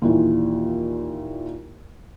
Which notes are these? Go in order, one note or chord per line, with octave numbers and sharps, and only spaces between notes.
D#2 A#2 E3